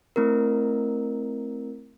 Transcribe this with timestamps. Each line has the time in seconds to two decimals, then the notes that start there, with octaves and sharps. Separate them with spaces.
0.16 A3 C4 E4 A#4